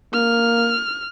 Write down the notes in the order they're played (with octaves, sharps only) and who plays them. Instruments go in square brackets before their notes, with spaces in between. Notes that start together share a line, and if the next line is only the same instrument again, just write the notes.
[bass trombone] A#3 [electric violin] F6